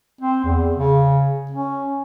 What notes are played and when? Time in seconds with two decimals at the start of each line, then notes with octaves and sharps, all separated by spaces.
0.21 C4
0.44 E2
0.76 C#3
1.51 C#4